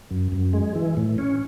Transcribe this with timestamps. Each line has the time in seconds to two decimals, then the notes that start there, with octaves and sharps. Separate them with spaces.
0.11 F#2
0.32 F#2
0.53 G#3
0.75 E3
0.97 A2
1.18 C#4